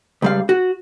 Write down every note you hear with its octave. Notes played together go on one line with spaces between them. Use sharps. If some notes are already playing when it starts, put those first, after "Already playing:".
C#2 G3 F5
F#4